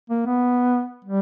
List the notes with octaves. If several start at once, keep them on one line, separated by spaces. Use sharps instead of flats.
A#3
B3
G3